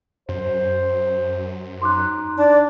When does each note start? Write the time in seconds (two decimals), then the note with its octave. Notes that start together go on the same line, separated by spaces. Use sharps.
0.29 F#2 C5
1.82 D#4 C6 D6 F#6
2.38 D4 D5